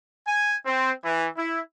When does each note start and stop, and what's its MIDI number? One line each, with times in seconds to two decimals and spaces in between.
0.26 0.55 80
0.66 0.92 60
1.04 1.28 52
1.37 1.60 64